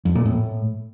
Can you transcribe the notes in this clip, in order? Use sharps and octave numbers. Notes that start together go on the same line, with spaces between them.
F2
A#2
A2